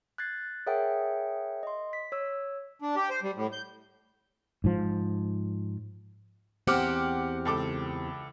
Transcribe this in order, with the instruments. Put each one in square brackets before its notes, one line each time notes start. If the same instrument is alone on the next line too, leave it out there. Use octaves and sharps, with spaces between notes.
[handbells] F#6 G#6 A6 C7
G#4 A#4 C#5 E5 F#5 G5
D#5 C6
B6
C#5 E6
[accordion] D4
G4
C5
G3
A2
G6
[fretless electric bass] G#2 F3
[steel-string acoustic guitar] E2 C4 G4 [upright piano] F#5 D6 F6
[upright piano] C#2 A4 D6